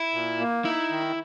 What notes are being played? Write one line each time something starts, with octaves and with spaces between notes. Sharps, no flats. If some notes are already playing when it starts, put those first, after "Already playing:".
Already playing: E4
A#2
A#3
D#4 E4
D#3